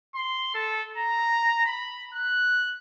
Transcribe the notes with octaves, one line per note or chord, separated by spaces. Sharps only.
C6
A4
A#5
B5
F#6